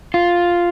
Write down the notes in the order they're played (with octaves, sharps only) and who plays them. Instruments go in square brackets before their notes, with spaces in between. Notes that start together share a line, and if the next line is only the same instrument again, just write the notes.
[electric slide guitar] F4